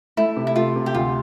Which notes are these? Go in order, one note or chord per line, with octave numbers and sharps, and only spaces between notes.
A3 E4
C3
E4
A3 F4
C3
G4
D2 F4